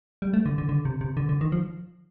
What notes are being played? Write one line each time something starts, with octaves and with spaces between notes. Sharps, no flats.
G3
A3
D3
D3
D3
C3
C3
D3
D3
D#3
F3